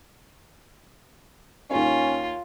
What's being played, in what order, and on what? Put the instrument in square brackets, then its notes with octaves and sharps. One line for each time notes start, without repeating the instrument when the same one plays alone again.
[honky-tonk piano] D#2 C#5 [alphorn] C#4 [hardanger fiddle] F4